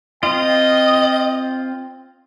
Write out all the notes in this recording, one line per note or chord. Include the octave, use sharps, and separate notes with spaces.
C4 F4 D#5 G5